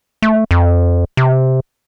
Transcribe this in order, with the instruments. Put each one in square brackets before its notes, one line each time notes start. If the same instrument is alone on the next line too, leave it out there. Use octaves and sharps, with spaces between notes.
[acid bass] A3
F2
C3